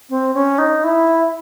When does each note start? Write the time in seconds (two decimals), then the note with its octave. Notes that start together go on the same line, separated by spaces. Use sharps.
0.09 C4
0.34 C#4
0.58 D#4
0.84 E4